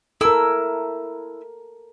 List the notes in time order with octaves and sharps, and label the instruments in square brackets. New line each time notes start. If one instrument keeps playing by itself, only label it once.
[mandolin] E4 E6 [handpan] A4 A#4